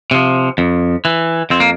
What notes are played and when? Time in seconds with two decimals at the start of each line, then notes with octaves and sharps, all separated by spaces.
0.11 C3 F3
0.58 F2
1.05 E3
1.50 F2 C4
1.60 A#3